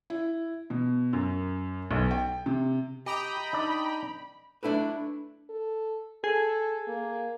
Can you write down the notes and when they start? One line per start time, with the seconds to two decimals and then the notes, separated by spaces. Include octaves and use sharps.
0.10 E4
0.70 B2
1.13 F#2
1.91 B1
2.11 G5
2.46 C3
3.06 G4 D#5 G5 A#5 B5
3.53 D4 D#4 D5
4.63 A3 D4 E4 A4 B4
5.50 A4
6.24 G#4 A4
6.88 A#3